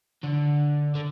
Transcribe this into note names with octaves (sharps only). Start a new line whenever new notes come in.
D3
D3